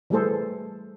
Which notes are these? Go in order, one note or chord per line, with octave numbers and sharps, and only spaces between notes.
E3 G3 A3 G#4 A4 C5